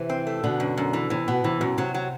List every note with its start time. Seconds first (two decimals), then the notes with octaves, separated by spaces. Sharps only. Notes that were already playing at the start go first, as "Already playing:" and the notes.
Already playing: C3 E3
0.10 C4
0.27 A3
0.44 B2 D3 B3
0.60 F#2
0.77 F#2
0.93 E3
1.10 C3 E3
1.28 B2 B3
1.44 C3 E3
1.61 F#2 B2
1.78 C3 F#3
1.94 F#3